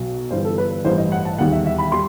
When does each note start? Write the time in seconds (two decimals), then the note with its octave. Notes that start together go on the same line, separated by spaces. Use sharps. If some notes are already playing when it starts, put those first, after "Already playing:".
Already playing: B1 B2 F#3
0.31 G1 G2 E3 G3 C5
0.45 A4
0.58 B4
0.85 A1 G2 E3 G3 C5
0.98 D#5
1.12 F#5
1.25 A5
1.38 E1 D#2 D#3 G3 F#5
1.52 E5
1.66 E5
1.78 B5
1.92 G3 C6